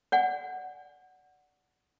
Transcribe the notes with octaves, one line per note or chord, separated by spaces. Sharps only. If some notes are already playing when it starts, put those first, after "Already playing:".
D5 F#5 G#5